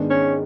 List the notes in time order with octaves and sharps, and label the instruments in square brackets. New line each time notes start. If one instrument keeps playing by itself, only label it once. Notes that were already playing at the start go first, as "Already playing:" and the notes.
Already playing: [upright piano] G#2 D#3 G#3 B3 D4
[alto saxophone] C#4